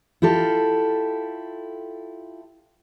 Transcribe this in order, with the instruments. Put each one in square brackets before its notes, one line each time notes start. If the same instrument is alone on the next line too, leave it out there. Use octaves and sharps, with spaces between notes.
[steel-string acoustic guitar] E4 F4 G4 A4